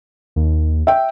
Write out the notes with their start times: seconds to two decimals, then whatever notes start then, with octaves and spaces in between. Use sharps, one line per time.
0.36 D#2
0.87 E5 G5